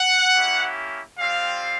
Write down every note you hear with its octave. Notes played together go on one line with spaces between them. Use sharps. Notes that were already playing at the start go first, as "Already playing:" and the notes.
Already playing: F#5
A#3 C#4 E4 G4
G3 C4 F4 F5